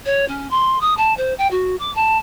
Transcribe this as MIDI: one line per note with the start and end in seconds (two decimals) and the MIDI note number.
0.06 0.27 73
0.28 0.48 61
0.51 0.80 84
0.81 0.96 87
0.97 1.14 81
1.17 1.34 72
1.38 1.50 79
1.51 1.76 66
1.80 1.91 86
1.95 2.18 81